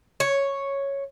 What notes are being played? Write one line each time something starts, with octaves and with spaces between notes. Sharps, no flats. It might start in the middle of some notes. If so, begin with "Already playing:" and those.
C#5